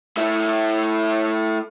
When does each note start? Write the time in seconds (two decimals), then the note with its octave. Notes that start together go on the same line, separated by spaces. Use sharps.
0.17 A3 E4